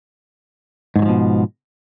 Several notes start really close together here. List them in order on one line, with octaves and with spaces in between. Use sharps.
G#2 D#3 F#3 F3 B2